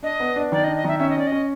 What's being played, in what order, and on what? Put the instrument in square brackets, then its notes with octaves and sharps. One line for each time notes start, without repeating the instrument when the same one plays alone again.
[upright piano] D4 [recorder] D#5
[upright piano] B3
D4
[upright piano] D#3 [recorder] D5
[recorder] D#5
[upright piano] D4
[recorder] D#5
[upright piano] D#3 [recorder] E5
[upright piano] C#4 [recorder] E5
[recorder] D#5
[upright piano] C#4 [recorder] D5
[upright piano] C#4 [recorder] D#5